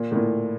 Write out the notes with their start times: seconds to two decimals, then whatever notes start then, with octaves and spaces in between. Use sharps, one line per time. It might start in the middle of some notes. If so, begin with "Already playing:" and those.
Already playing: A#2
0.12 A2
0.16 A#2